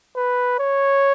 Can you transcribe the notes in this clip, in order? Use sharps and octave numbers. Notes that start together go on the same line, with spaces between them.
B4
C#5